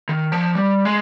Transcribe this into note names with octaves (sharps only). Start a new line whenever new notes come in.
D#3
F3
G3
G#3